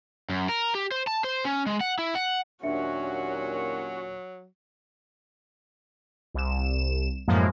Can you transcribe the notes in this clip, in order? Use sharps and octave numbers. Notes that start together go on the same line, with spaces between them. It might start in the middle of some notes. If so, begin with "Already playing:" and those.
F#2
A#4
G4
C5
A5
C5
C#4
G#3
F#5
E4
F#5
D#2 A#2 F#3 C#4 D4 F#4 E5 C#7
C2 E7
F#2 A2 F3 G#3 A#3